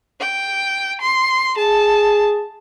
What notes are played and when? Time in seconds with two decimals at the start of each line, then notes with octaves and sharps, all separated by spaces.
0.20 G5
1.02 C6
1.58 G#4 A5